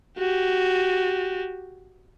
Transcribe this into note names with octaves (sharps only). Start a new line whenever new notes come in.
F#4 G4